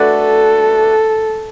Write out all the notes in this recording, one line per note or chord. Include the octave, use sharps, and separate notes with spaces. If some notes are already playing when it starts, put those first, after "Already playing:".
Already playing: A3 D4 F#4 A4 B4 D5